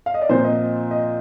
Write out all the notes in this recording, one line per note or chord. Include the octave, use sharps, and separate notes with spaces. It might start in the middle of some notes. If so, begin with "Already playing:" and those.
F5
D#5
D5
A#2 F3 C4 C5
D#5
D#5